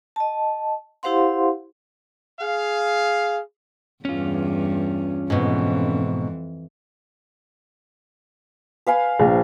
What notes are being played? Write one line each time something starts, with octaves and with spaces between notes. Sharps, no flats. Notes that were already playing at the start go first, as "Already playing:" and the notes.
D#5 A5
E4 G4 C5 F5 F#5 C6
G#4 F5
E2 G2 C#4 F4
F2 G#2 B2 E3
B4 F5 G#5
A#1 F3